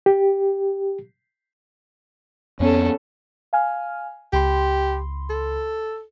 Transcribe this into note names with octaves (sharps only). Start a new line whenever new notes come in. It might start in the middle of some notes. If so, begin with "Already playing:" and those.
G4
F2 B3 C#4 A4
F5 G#5 F6
C#2 G4 B5 C6
A4